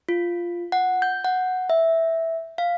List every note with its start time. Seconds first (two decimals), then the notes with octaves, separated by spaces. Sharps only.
0.09 F4
0.72 F#5
1.02 G6
1.25 F#5
1.70 E5
2.58 F5